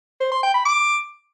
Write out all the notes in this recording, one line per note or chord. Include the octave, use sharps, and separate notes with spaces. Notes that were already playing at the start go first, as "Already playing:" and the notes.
C5
C6
G5
B5
D6